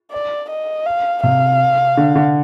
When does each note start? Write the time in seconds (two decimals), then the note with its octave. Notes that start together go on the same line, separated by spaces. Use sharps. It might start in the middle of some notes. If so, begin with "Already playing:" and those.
0.12 D5
0.49 D#5
0.86 F5
1.23 C3 F5
1.97 D3
2.15 D3